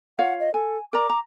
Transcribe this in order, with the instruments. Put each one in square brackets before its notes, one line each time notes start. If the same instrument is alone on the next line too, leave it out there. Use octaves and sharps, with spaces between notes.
[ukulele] F4 C#5 F5 [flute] F#5
[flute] D#5
[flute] A4 [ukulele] G#5
[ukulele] A#4 D5 A#5 [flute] D6
[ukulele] A#5